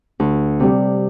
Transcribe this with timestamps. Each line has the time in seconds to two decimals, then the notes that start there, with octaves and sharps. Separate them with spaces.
0.20 D2
0.60 C3 G3